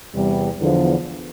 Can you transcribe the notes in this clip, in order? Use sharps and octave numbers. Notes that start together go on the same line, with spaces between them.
E2 C3 G3
E2 D3 F3